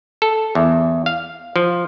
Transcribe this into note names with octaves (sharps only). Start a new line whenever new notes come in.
A4
E2
F5
F3